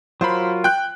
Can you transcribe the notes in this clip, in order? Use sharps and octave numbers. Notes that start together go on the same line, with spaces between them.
F#3 F4 A#4 C5 B5
G5 F#6